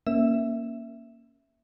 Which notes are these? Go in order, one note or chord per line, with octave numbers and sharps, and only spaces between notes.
A#3 C#4 E5 E7